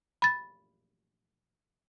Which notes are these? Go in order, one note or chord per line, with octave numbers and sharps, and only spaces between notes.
B5 A6